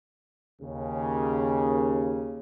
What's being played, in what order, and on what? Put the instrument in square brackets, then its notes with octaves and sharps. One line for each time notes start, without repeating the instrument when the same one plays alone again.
[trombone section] D#2 C#3